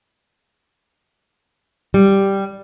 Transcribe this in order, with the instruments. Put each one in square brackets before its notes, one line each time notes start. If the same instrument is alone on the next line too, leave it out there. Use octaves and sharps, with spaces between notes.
[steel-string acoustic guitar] G3